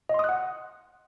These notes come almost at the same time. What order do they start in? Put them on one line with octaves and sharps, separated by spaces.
D#5 C6 D#6 F#6 F#5